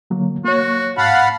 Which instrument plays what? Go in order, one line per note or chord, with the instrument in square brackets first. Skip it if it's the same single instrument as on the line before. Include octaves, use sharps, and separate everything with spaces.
[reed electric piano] D3 F#3 A#3
[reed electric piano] A#3 C#5 [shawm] F#4
[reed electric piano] G#2 [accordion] F5 F#5 B5 [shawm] A5